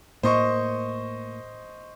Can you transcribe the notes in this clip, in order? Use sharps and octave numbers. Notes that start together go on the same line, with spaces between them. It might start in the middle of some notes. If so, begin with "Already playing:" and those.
A2 A#3 C5 D#5 C#6